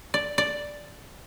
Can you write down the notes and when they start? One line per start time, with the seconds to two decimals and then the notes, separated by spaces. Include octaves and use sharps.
0.14 D5
0.38 D5